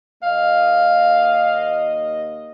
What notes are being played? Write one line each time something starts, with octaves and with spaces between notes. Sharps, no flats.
D#2 A#3 D#5 F5